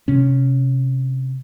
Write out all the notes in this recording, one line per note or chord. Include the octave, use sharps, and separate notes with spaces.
C3 C#4